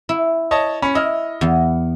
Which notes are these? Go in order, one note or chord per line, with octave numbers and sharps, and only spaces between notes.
E4
C#5 D#5 A5
C#4 B5
E4 D#5 F6
E2